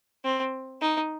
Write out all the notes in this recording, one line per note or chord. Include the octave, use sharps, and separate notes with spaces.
C4
D#4